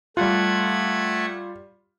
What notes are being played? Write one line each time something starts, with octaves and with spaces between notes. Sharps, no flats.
G3 A3 F4 F#5 G#6